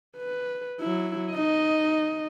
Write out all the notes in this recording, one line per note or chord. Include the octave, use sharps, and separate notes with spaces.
B4
F#3 E4
D#4 D#5